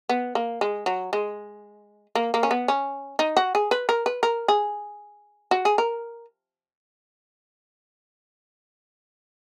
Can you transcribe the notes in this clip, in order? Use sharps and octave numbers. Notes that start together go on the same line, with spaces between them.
B3
A#3
G#3
F#3
G#3
A#3
A#3
C#4
B3
C#4
D#4
F#4
G#4
B4
A#4
B4
A#4
G#4
F#4
G#4
A#4